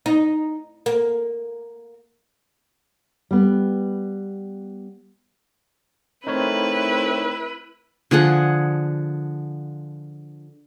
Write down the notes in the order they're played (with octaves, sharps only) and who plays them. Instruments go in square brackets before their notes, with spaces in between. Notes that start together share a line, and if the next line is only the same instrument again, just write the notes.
[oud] D#4
A#3
[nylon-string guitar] G3 B3
[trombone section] A3 C4 [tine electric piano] D#4 A#4 C#5 [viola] E4 B4
[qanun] D3 F3 G#4 F#5